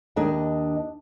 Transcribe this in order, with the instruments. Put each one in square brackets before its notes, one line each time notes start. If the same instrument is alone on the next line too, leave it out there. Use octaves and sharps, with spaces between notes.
[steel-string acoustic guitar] D#2 D4 D#5